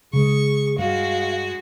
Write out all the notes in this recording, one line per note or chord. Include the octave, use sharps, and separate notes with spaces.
C#3 G#3 G#4 C#6
G2 G#3 F#4 F5